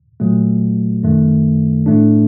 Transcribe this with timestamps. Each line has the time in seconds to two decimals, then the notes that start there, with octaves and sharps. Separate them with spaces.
0.20 A#2 F#3 A3
1.03 F#2 D#3 A3
1.86 A2 A3 D4